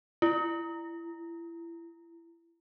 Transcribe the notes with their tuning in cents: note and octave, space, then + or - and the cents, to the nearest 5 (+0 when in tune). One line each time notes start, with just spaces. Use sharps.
E4 +30